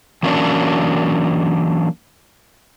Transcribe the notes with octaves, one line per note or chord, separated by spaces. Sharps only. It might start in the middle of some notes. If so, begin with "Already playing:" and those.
E3 F#3 A#3 C#4 D4